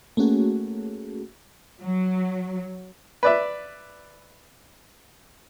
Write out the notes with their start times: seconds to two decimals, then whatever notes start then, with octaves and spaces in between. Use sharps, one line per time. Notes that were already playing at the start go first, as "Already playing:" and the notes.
0.17 A3 A#3 C#4 F#4 G#4
1.81 F#3
3.23 B4 D5 E5